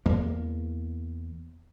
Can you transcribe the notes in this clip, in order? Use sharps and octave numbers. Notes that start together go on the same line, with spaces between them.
E2 A#3